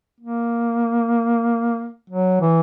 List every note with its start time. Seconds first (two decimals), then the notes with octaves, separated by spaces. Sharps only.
0.21 A#3
2.10 F#3
2.41 E3